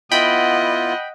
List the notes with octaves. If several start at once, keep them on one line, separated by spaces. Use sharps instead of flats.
B3 E4 F4 D#5 F#5 G5 B5